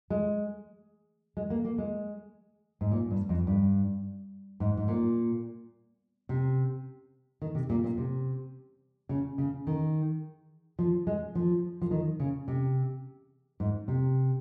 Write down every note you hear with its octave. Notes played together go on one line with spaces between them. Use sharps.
G#3
G#3
A#3
A#3
G#3
G#2
A#2
G2
F2
G2
G#2
G#2
A#2
C3
D#3
C3
A#2
A#2
C3
C#3
C#3
D#3
F3
G#3
F3
F3
D#3
C#3
C3
G#2
C3